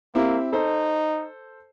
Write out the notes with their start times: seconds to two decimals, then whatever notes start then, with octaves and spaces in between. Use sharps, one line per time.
0.15 A#3 C4 E4 G4
0.53 D#4 A4 C5